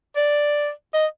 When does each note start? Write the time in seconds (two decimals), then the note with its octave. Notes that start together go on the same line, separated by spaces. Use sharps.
0.16 D5
0.94 D#5